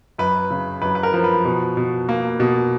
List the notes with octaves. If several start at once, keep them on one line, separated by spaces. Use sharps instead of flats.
F#2 B4
C#3
F#2 B4
B4
A#4
F3
B4
B2
B2
A#3
B2